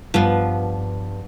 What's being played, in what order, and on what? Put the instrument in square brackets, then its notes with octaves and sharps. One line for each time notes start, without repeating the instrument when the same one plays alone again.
[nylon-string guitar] G2 [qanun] F3 B3